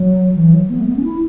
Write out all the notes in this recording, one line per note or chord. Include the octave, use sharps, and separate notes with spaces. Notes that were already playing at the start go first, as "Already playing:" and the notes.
Already playing: F#3
E3
F#3
B3
A3
B3
C#4
E4